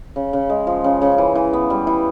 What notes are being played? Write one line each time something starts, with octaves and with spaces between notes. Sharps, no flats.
C#3
C#3
G#3
F3
C#3
C#3
E3
E3
B3
G3
E3